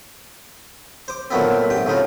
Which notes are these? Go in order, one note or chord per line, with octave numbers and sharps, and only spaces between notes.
C5 D6
A#2 D#3 F#3 A3 B3 C4
G#2 C3 G5
A2 C#3 D#4 F4